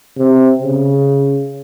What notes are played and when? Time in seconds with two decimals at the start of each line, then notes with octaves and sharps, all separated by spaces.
0.17 C3
0.62 C#3